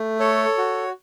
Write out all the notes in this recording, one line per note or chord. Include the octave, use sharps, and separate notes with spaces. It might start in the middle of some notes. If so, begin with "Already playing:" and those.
Already playing: A3
A4 C#5
F#4